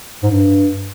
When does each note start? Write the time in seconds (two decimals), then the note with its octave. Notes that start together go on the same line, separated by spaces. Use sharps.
0.23 G#2
0.30 G2